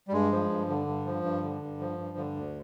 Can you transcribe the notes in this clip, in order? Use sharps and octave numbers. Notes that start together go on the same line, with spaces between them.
G3
G2 G#3
F3
G2
D3
G2
F3
G2
D3
G2
F3
G2
D3
D2